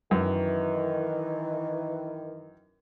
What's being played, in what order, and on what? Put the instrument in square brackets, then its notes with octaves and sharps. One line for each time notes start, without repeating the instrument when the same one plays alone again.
[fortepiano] F#2 [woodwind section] D#3 E3